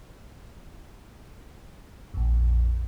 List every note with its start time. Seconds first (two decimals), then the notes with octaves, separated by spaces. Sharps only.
2.14 A#1 F2